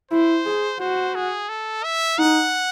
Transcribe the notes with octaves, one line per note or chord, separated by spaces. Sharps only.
E4 C5
G#4
F#4 C5
G#4
A4
E5
D#4 F#5